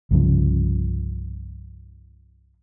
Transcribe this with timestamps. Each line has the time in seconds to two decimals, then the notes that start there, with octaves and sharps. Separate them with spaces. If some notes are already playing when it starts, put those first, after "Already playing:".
0.11 C2 G2 C#3 F3